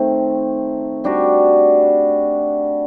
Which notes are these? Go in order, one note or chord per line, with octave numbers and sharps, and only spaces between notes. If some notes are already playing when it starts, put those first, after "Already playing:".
Already playing: D#3 A3 C4
G3 D4 F#4